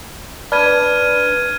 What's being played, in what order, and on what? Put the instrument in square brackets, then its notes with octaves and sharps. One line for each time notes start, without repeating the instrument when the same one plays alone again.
[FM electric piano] D4 B4 [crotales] F6 G#6 D#7